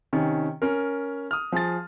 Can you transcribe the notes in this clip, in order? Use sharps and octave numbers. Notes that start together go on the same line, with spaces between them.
C3 D#3 C#4
C#4 A#4
D#6 F6
F3 G#4 A6